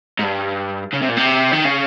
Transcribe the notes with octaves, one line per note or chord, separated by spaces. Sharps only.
G#2
G2
C#3
C3
A#2
C3
D#3
C#3